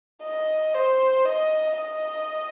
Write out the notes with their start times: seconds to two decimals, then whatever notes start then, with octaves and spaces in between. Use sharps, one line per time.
0.23 D#5
0.74 C5
1.25 D#5
1.77 D#5